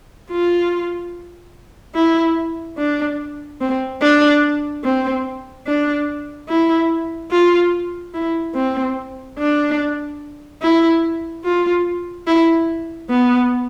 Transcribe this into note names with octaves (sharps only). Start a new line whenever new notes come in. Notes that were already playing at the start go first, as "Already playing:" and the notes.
F4
E4
D4
C4
D4
C4
D4
E4
F4
E4
C4
D4
E4
F4
E4
B3